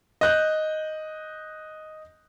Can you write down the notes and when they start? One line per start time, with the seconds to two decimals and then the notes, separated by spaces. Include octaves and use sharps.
0.21 D#5 F#6 G6